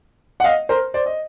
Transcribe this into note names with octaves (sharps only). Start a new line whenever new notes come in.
F#5
D#5 F5
A#4 C5
C5 D5
D#5